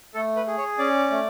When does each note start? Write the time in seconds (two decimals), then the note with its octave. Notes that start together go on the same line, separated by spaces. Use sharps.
0.14 A3 A4
0.36 B4
0.47 G#4
0.58 C#5
0.78 C#4 D5
1.10 A3